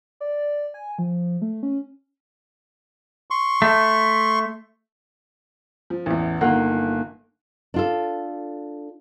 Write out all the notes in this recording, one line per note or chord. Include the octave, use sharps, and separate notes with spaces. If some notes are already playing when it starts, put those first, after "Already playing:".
D5
G#5
F3
A3
C#4
C6 C#6
A3
F3
A1 E2
G1 D#3 A#3 F4 F#5
D4 F4 A4